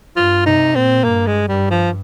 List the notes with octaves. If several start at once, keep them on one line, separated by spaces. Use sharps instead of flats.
G2 F4
C3 D#4
A#2 C4
G2 A#3
G#3
G2 G3
F3